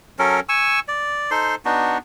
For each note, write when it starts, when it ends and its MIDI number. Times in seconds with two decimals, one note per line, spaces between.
0.19 0.40 54
0.19 0.40 61
0.19 0.40 69
0.19 0.40 70
0.49 0.80 80
0.49 0.80 85
0.49 0.80 88
0.88 1.30 74
1.31 1.55 63
1.31 1.55 69
1.31 1.55 72
1.31 1.55 84
1.65 1.98 59
1.65 1.98 62
1.65 1.98 63
1.65 1.98 66